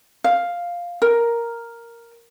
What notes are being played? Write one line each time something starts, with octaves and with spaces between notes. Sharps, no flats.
F5
A#4